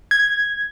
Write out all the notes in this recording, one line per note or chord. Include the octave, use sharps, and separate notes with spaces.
G#6